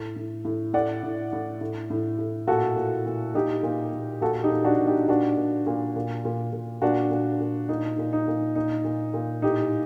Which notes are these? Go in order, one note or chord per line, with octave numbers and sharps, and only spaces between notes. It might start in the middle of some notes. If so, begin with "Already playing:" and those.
Already playing: A2
A2
A2
A2 D5 F#5
A2
A2
A2
A2
A2
A#2 F#4 A4
A#2
A#2
A#2 D#4 G4
A#2
A#2
A#2 F#4 A4
D#4 G4
A#2
D4 F#4
A#2
D#4 G4
A#2 D4 F#4
A#2
A#2
A#2
A#2
A#2
A#2 D4 F#4
A#2
A#2
A#2 D#4
A#2
D#4
A#2
A#2 D#4
A#2
A#2
A2 D#4 G4